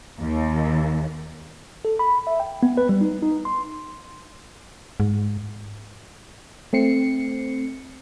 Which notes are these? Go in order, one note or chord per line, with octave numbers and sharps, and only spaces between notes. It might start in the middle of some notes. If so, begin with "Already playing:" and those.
D#2
A4
B5
E5
G5
B3
B4
G3
D#4
D#4
C6
G#2
A3 C4 C7 C#7